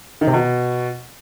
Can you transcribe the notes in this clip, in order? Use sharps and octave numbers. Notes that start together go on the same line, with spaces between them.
D#3
C3
B2